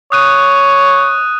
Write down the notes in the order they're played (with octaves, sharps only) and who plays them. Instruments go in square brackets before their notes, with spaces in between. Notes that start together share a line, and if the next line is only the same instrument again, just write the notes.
[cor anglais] C#5 [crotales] D#6 F#6 D#7